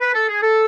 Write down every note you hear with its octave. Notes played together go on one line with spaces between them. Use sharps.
B4
A4
G#4
A4